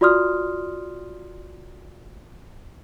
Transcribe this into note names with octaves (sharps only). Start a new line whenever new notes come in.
F4 F#4 D5 C6 D#6 F6